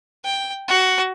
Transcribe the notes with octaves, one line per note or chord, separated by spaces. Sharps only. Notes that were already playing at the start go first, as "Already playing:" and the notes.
G5
F#4